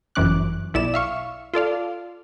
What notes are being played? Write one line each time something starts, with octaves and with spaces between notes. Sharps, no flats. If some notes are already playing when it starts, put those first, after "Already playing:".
G1 F#2 E3 C#4 D6 F#6
B1 E4 D5 E7
E5 F5 C#6
F4 A4 D5 F5